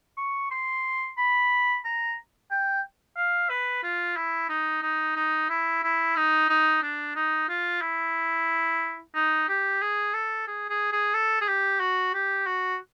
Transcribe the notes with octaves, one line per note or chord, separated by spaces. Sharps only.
C#6
C6
B5
A#5
G5
F5
B4
F4
E4
D#4
D#4
D#4
E4
E4
D#4
D#4
D4
D#4
F4
E4
D#4
G4
G#4
A4
G#4
G#4
G#4
A4
G#4
G4
F#4
G4
F#4